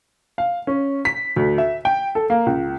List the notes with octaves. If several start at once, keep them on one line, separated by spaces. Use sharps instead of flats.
F5
C#4
B6
D2
E5
G5
A4
A#3
C#2